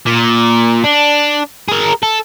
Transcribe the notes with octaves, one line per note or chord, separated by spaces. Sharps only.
A#2
D4
G#4 A#4
A4